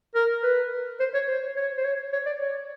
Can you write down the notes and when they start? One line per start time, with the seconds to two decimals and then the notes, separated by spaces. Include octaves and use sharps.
0.15 A#4
0.43 B4
1.00 C5
1.14 C#5
1.28 C5
1.56 C#5
1.78 C5
1.84 C#5
2.13 C#5
2.26 D5
2.40 C#5